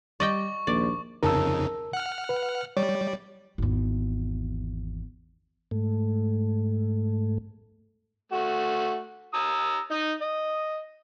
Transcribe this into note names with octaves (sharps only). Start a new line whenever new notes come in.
G3 D5 D#5 G5 C#6
A#1 D#2 D5
F2 C#3 D#4 A#4 A5 E6
F#5 F6
B4
G3 C#5 D5
G#1 E2
G#2 A3
A3 F#4
A#5 D#6 E6
D#4 D#5
D#5